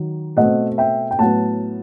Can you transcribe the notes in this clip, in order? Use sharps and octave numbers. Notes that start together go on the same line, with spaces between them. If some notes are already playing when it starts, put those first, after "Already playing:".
Already playing: D#3 F#3
B2 A3 C4 D#5 F#5
E5 G5
G5
A2 F#3 B3 F#5 A5